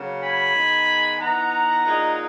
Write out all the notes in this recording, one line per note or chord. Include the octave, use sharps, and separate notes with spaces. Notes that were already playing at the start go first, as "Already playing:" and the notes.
Already playing: C#3 F#3 A#3
G#5 B5
D#3 G#3 B3
E3 B3 D#4 F#5 A#5
A#2 G#3 D#4